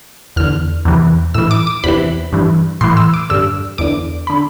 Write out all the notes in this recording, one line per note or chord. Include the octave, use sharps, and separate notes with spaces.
E2 D3 F6
E2 C3 E3
A2 E3 E6
D6
D6
E2 C3 E3 B5
G2 E3
A2 E3 C6
E6
D6
G2 D3 E6
E2 D3 D6
D3 B5